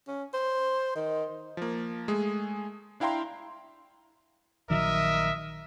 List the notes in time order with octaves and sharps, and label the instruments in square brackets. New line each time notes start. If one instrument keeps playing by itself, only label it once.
[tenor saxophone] C#4
C5
D#3
[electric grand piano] F3 A#3
G#3 A3 G#4
D4 E4 F5 G5 A#5 C6
[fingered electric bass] A#1 D#3 F#3 [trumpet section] A#4 D#5 E5